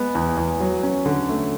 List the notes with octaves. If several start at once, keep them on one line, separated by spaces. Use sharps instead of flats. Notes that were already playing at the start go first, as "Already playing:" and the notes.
Already playing: G#3 B3
E2
E2
F#3
C#4
D3
A3